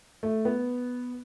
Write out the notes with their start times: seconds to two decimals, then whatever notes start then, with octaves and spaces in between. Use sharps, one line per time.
0.23 A3
0.45 B3